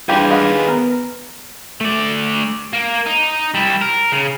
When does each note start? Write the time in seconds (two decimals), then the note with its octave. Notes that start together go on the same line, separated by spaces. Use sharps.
0.09 E3 G3 D4 F4 G4 G#4 B4 G5
0.30 G#3 F5 F#5
0.50 D#3
0.68 B3 A#4
1.81 A3 D5
2.73 A#3
3.06 D#4
3.54 G3 E4
3.81 A#4
4.12 C#3